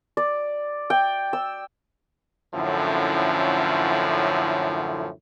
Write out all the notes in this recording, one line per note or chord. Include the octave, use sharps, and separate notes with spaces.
D5
G5
E6
F#2 A2 D3 F3 C#4 E4